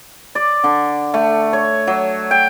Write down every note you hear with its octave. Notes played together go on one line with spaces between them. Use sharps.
D5
D3
A3
C#5
F#3
G5